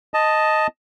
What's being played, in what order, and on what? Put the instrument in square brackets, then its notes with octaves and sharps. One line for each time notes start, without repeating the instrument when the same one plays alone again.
[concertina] D#5 A5